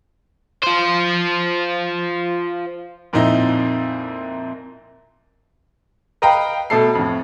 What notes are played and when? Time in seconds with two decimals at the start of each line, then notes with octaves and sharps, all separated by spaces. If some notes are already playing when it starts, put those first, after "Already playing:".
0.64 F4 C5
3.13 F2 A#2 C4 D#4 E4
6.22 B4 D#5 F5 G5 A#5 B5
6.70 B2 A3 A4 C7
6.95 F2 A2